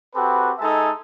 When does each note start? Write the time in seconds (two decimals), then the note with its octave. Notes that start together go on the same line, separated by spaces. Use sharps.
0.14 C4 F#4 G4 A4 B4
0.59 G#3 D#4 A4 E5 G#5 A5